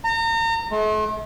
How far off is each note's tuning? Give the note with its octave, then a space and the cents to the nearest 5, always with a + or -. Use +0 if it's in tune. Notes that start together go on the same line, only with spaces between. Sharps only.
A#5 -35
A3 -45